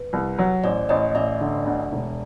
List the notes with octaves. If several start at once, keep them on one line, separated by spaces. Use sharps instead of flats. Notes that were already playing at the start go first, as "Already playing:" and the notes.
Already playing: B4
C2
F#3
A1 C5 D5
A1 C#5 D#5
A1 D5 E5
D3
D2
E1